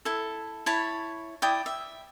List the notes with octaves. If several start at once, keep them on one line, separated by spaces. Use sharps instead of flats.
E4 A4
E4 C#5 A5 B5
E4 D5 G5 D#6
E5